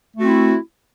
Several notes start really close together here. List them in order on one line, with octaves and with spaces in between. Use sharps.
A3 F#4 C4 E4